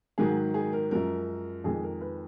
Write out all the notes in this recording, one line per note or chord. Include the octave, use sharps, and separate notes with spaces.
G#2 D#3 F#3 G#4
G#4
A#4
F#2 F3 G#3 A#4
F2 D#3 G#3 G#4
A#4
B4